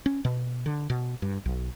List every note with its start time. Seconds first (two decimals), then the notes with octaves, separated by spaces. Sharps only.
0.06 C#4
0.25 B2
0.66 D3
0.90 B2
1.22 G2
1.46 B1